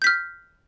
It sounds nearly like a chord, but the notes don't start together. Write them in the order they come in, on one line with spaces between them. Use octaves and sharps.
G6 B6 F6